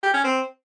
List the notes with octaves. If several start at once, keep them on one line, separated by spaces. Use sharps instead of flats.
G4
C#4
C4